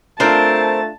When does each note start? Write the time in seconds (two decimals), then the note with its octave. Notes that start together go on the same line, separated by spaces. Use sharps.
0.20 A3 C4 D4 F4 A#4 A5